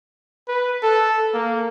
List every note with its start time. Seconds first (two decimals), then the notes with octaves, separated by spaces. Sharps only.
0.48 B4
0.82 A4
1.34 A#3